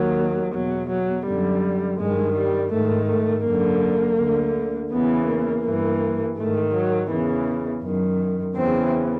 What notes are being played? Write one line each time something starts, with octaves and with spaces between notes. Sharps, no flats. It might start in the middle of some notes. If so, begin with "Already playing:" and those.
Already playing: D#2 D#3 F#3
E2 B2 F#3
F#3
F#2 D3 G3
G2 D#3 G#3
G3
G#2 D#3 A3
A3
F#2 D3 A#3
D2 D3
E2 C#3 E3 B3
A#3
G2 E3
G#2 D#3 A3
F#3
E2 C#3 E3
F#2 D#3
E2 C#3 E3 C4